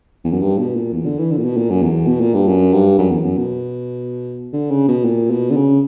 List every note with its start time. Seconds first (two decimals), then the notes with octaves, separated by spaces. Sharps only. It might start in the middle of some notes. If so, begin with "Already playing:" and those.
0.24 E2
0.33 F#2
0.42 G2
0.58 B2
0.76 A#2
0.93 E2
1.06 D3
1.19 E3
1.31 D3
1.38 A#2
1.45 B2
1.57 A#2
1.70 F#2
1.83 E2
2.07 B2
2.21 A#2
2.34 G2
2.48 F#2
2.73 G2
2.99 F#2
3.11 E2
3.25 F#2
3.37 B2
4.53 D3
4.71 C#3
4.88 B2
5.05 A#2
5.30 B2
5.51 D3
5.56 C#3